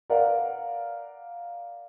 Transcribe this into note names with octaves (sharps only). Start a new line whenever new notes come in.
A#4 B4 D5 F5 F#5